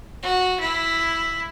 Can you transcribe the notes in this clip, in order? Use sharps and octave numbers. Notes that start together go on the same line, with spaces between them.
F#4
E4